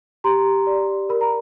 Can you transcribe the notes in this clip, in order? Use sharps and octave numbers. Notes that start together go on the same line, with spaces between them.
G4 A#5 C6
D5
A#4 B5
A#5